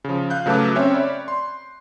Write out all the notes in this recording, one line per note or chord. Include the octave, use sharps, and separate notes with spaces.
C#3 F3
F5 F#6 G6
C#3 F#3 A3 B4 A5 D6
C4 C#4 C#5 E5
C#5 D5 B5
C6